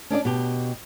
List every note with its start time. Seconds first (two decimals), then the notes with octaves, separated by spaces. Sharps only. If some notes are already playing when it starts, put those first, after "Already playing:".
0.10 C#4 D4 E4 D5
0.25 B2 G4